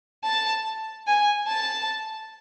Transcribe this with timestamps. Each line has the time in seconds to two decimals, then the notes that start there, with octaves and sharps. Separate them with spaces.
0.24 A5
1.07 G#5
1.48 A5